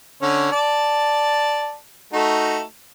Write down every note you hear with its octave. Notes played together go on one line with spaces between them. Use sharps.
D3 C#4
D5 A5
A3 D#4 F#4